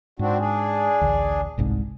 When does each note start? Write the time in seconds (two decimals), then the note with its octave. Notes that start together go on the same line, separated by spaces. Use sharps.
0.19 G#2 C4 D4 F#4
0.39 D4 G#4
1.01 A1 D2
1.58 G1 C2 G#2